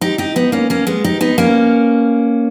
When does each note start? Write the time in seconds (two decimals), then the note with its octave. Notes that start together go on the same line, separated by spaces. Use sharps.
0.01 D#4 G4
0.18 D#4 G4
0.36 B3 D#4
0.52 A#3 C#4
0.70 A#3 C#4
0.87 G#3 B3
1.04 D#4 G4
1.21 B3 D#4
1.38 A#3 C#4